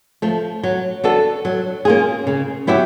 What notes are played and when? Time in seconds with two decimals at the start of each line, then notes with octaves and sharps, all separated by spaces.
0.22 F3 A3
0.63 F#3
1.04 B3 D4 F#4 A4
1.45 F#3
1.85 A#3 C#4 F4 G#4
2.27 C#3
2.67 F#3 B3 E4 G4